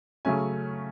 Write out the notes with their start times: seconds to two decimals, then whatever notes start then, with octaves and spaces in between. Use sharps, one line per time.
0.25 C#3 F#3 A3 C#4 G#5